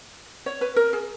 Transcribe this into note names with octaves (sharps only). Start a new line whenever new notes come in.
C#5
B4
A#4
G#4